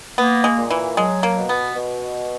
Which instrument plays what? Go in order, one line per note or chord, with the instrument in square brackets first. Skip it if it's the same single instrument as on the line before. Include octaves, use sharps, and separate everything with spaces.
[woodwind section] A#3 [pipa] B3
[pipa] G#3
[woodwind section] A#2
[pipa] E3
[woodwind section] F#3 [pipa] G#3
[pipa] A#3
[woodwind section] B2
[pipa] B3
[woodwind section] B2